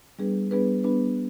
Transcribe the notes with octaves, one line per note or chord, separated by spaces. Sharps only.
G3 B3 D4 G#4 B4
G3 B3 D4 G#4 B4
G3 B3 D4 G#4 B4